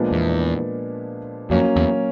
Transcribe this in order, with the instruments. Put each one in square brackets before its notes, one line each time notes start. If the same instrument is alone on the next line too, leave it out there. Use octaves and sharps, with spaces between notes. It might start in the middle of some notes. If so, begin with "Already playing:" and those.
Already playing: [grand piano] A#2 F3 G#3 B3 D4
[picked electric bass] E2
[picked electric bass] F2 [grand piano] F#3 A#3 C#4
[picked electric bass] E2